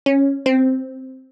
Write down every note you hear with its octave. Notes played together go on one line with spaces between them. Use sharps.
C#4
C4